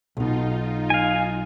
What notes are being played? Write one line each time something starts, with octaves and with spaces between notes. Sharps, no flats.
B1 B2 D#4 F4
F5 G#5